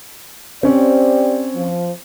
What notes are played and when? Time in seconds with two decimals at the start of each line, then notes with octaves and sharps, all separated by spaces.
0.63 C4 C#4 G4 C5 D5
1.56 F3